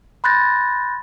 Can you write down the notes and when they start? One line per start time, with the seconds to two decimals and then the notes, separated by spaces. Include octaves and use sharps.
0.24 B5 C6 F#6 G6 A6 A#6